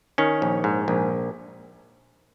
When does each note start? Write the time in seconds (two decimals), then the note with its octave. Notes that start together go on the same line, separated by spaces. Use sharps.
0.18 D#3 C#4
0.42 A#1
0.64 G#2
0.88 A#1